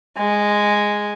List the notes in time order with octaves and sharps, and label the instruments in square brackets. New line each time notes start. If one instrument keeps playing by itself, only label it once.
[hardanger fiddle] G#3